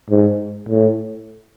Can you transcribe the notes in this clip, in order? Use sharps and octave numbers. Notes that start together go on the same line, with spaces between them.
G#2
A2